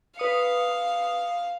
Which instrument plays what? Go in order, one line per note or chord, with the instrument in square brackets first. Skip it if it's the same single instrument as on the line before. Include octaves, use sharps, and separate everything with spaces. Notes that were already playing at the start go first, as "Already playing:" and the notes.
[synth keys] B4 D#6 C#7 [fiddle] F5